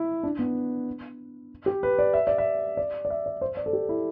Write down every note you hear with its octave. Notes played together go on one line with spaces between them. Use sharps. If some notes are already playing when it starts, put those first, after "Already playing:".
Already playing: E4
D4
B3
G4
B4
D5
E5
D5
E5
D5
D5
E5
D5
C5
D5
A4
G4
E4